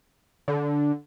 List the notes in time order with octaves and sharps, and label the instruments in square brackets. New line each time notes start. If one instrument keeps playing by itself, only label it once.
[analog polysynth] D3